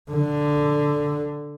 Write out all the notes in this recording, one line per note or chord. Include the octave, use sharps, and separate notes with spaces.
D3